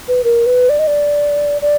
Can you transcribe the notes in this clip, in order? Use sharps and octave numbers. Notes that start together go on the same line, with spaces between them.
B4
A#4
B4
D5
D#5
D5
D5